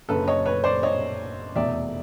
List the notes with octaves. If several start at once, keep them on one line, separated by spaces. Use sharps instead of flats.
F#1 F#2 D3 A4 B4
C#5 D#5
B4 C#5
C5 D5
C#5 D#5
F1 E2 B2 D5 E5